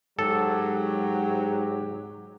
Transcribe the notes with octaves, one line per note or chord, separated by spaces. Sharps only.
G#2 F#3 G4 A4